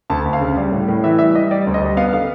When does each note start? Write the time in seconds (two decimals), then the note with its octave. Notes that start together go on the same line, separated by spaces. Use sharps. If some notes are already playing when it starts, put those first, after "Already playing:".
0.10 D2 A5
0.25 D2
0.33 F5
0.41 C#3
0.57 G3
0.72 A2
0.88 A2
1.04 E3 E5
1.18 G3 E5
1.35 G3 D#5
1.51 G3 D5
1.67 D2
1.74 D#5
1.82 G3
1.97 B3 F5
2.13 D3 F5